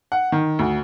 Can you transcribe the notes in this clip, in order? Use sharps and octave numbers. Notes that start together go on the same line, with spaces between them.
F#5
D#3
D2